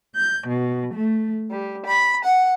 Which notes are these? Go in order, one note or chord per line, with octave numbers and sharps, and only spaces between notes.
G6
B2
A3
G3
B5
F#5